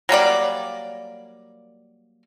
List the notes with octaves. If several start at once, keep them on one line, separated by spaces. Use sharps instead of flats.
F#3 G3 A#3 D5